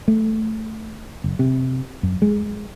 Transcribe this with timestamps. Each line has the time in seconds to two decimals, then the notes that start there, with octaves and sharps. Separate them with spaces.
0.08 A3
1.24 F#1
1.39 C3
2.03 F#2
2.22 G#3